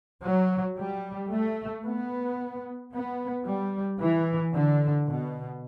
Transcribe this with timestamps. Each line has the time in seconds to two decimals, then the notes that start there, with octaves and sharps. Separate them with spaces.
0.23 F#3
0.77 G3
1.31 A3
1.85 B3
2.92 B3
3.45 G3
3.99 E3
4.53 D3
5.07 B2